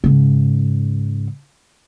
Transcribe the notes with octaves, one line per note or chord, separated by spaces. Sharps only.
G#2 C#3